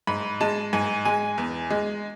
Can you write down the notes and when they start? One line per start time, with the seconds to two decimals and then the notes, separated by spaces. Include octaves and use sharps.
0.07 G#2 B5
0.41 G#3 A5
0.73 G#2 G#5
1.05 G#3 G#5
1.38 E2
1.70 G#3